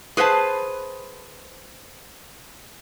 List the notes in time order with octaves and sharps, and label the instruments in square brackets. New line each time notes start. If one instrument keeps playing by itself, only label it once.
[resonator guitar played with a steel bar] G#4 B4 C5 F5 A5